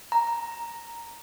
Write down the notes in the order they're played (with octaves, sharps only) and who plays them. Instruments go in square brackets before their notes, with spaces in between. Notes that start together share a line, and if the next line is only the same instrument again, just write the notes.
[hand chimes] A#5